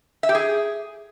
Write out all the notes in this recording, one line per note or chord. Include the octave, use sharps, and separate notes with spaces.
E5
G4
G#4